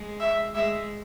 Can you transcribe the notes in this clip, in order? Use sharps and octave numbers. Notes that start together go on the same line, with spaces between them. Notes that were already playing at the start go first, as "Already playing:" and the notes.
Already playing: G#3
E5
G#3 E5